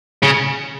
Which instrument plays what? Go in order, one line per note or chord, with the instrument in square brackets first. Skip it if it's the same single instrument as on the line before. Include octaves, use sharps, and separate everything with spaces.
[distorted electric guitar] C#3